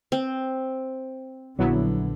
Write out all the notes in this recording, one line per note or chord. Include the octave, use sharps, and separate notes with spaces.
C4
A#1 D3 F#3 B3 E4